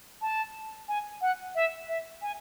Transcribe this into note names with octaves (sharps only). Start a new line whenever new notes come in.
A5
G#5
F#5
E5
E5
G#5